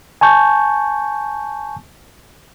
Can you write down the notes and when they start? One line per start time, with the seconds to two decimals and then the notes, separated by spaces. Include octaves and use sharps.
0.21 G#5 A5 C#6 G6